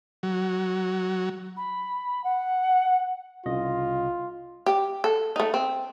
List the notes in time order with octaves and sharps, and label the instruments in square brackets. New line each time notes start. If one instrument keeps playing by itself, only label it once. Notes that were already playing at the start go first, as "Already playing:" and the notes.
[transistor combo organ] F#3
[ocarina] B5
F#5
[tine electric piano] C2 C#3 D#5 [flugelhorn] F4
[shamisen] G4
A4
A3 D#4
C4